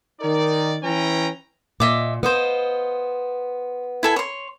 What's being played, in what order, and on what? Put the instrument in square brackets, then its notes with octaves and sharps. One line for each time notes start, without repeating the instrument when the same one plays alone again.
[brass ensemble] D#3 D#4 A#4 D5
E3 C#4 B4 G5 A#5
[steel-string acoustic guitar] A#2 [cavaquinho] D#5 E5 D6
[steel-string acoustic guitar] B3 [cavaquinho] C5 D#5 F5
[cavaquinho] E4 A4 G#5
C#5 C6